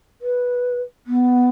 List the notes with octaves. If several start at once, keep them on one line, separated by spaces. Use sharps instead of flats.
B4
B3